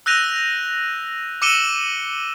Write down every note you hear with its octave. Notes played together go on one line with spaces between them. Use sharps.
E6 F#6 G6 A#6 D#7 F7
D6 E6 C#7 D#7 E7 G7